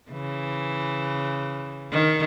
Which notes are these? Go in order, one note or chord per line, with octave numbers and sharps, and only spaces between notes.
C#3 E3
D#3